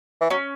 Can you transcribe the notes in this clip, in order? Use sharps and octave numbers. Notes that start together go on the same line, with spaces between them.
E3
F#3 C#4